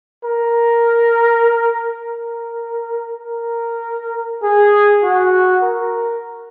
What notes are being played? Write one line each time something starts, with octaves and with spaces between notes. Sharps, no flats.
A#4
A#4
A#4
G#4
F#4
A#4